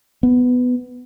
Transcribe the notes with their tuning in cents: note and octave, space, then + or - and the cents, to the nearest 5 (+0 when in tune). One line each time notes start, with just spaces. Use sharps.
B3 +10